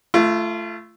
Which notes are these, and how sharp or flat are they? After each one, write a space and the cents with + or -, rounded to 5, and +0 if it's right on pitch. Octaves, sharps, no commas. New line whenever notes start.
A3 +0 F4 -30